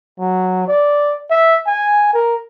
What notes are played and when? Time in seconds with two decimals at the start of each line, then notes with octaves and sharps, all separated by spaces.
0.19 F#3
0.68 D5
1.30 E5
1.67 G#5
2.14 A#4